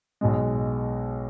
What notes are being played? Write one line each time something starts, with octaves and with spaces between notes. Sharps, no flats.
B1 B2 G#3